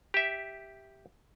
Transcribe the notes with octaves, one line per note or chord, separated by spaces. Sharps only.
G4 E5